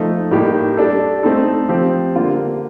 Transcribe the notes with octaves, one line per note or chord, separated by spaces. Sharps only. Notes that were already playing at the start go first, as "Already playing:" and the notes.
Already playing: F3 A3 D#4
A2 G3 A#3 D#4 G4
G3 D4 A4
A3 C4 D#4 A4
F3 C4 G4
D3 G3 A#3 F4